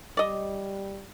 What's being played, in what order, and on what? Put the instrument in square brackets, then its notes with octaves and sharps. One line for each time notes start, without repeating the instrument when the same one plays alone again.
[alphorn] G3 [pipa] D5 D#5